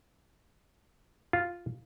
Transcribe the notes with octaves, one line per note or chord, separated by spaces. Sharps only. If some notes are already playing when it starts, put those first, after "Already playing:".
F4